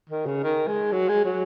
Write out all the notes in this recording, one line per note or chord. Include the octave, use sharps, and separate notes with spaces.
D#3
C#3
D#3
G#3
F#3
G#3
F#3